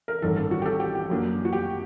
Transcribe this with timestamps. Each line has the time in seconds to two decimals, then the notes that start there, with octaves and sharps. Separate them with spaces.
0.08 A#4
0.22 A1 G2 D#3 A4
0.37 A4
0.51 F#4
0.62 G4
0.66 A4
0.80 G4
0.95 G4
1.10 F#2 F#3 A#3 D4
1.45 F#4
1.53 G4